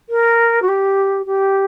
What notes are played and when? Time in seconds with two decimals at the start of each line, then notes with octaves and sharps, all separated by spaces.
0.09 A#4
0.62 F#4
0.68 G4
1.26 G4